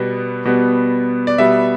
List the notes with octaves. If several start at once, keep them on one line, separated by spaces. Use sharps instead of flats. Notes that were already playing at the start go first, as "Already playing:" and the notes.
Already playing: B2 G3 B3
B2 G3 B3
D5
B2 G3 B3 E5